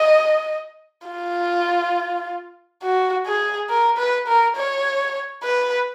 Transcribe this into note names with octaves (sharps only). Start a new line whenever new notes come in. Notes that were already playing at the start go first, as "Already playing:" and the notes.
Already playing: D#5
F4
F#4
G#4
A#4
B4
A#4
C#5
B4